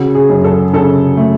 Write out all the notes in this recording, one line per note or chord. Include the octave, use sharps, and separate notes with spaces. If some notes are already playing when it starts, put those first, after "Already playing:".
Already playing: C#3 F#4
G#4
F#2
A4
C#3 A4
A3